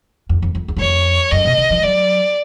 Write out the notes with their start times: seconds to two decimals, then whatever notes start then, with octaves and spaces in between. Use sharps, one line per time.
0.29 F2
0.42 F2
0.55 F2
0.68 E2
0.76 F#2
0.80 F2 C#5
1.32 F#2 D#5
1.45 B2
1.58 D3
1.71 F3
1.83 F#3 D5